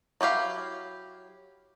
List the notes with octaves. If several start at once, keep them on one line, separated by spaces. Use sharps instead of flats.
F#3 E4 G4 F5